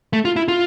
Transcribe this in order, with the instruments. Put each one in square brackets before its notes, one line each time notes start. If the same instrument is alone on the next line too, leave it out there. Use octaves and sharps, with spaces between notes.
[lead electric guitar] A3
F4
E4
F4